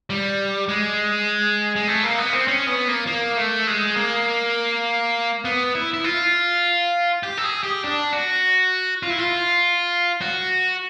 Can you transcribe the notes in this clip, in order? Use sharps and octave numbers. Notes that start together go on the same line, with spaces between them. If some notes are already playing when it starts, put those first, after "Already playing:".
G3
G#3
G#3
A3
A#3
B3
C4
C#4
B3
A#3
A#3
A3
G#3
A#3
B3
E4
E4
F4
G4
A4
G#4
G4
D4
F#4
F4
E4
F4
F#4